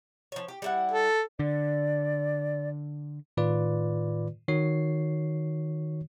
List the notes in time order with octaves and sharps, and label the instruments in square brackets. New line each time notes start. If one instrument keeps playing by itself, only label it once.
[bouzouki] F3 C#5
G4
G3 E4 F#5
[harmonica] A4
[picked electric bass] D3 [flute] D5
[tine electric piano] A2 D#3 F4 B4 D5
D#3 F#4 C#5 C7